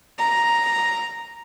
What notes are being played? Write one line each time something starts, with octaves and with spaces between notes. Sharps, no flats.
A#5